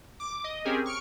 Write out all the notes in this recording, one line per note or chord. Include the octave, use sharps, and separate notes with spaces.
D6
D#5
C4 C#4 G4 G#4 A#4
C#6 F6 C#7 D7